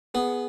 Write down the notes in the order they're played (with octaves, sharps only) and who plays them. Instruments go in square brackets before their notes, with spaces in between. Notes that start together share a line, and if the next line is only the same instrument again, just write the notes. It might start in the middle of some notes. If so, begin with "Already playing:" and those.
[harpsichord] B3 [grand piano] G#4